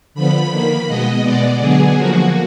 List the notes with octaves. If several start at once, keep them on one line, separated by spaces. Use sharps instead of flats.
D3 F3 B3 B5
D#3 A#3
B2 G#3 B3 D#5
B2 G#3 B3 D5
D3 F#3 B3 G#4
D3 F3 A#3 F#4